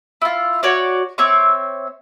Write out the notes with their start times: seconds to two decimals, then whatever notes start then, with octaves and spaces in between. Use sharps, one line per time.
0.22 E4 F4
0.63 F#4 C#5 D5
1.18 C4 C#5 E5 D6